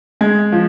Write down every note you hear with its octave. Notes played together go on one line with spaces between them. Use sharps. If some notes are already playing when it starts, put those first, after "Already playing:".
G#3 G#6
F3